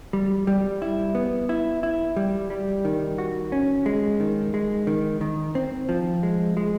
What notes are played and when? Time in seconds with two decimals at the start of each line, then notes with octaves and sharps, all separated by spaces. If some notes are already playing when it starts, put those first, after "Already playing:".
0.13 G3
0.47 G3
0.82 E4
1.15 B3
1.49 E4
1.83 E4
2.16 G3
2.50 G3
2.85 D#3
3.18 F#4
3.52 C#4
3.86 G#3
4.20 D#3
4.54 G#3
4.87 D#3
5.21 D#3
5.55 C4
5.89 F3
6.23 G#3
6.57 G#3